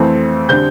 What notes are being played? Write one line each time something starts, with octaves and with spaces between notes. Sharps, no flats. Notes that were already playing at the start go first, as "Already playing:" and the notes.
Already playing: F2 E3 A3 C4
D3 G3 C4 G6